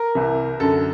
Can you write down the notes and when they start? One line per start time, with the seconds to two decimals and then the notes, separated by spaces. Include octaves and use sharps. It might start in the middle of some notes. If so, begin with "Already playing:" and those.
Already playing: A#4
0.15 C2 C3 E3
0.60 F#2 D3 A4